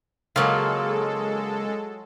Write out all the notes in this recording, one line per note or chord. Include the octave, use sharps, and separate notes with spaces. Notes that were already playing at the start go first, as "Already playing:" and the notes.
C#3 F#3 G#3 A#3 F4 A4